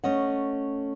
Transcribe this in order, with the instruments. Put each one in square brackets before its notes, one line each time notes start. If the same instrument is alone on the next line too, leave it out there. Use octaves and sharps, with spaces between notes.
[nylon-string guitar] A3 C#4 D#5 F#5